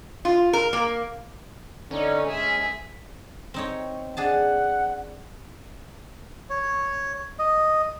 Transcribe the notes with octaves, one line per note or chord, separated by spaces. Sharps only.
F4
A#4
A#3
D3 C#4 D#4 C#5
G#3 G#4 E5
C4 D#4 C#5
D4 G#4 F#5 A5
C#5
D#5